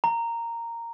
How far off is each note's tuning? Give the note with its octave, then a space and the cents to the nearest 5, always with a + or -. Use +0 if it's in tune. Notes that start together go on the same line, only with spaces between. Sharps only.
A#5 -10